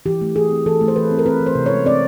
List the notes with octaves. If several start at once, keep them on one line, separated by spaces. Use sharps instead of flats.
E3 G4
A3
E3 G#4
C4
E3 A4
A3
C5
E3 B4
C4
A#4
C4 B4
E3
C5
C3
G#3 C#5
C4 D5